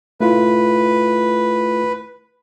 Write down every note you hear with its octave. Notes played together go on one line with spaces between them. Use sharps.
A3 E4 F4 B4